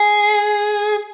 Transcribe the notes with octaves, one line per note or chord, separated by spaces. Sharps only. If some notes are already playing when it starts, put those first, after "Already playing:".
Already playing: G#4